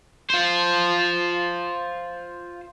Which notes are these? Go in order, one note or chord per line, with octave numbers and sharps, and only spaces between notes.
F4 C5